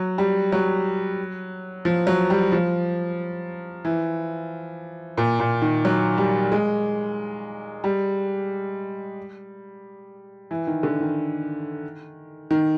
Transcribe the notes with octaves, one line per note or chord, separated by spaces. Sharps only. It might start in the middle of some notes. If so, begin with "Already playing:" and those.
Already playing: F#3
G3
F#3
F3
F#3
G3
F3
E3
A#2
A#2
D#3
F#3
G3
G#3
G3
E3
D#3
D3
D#3
D#3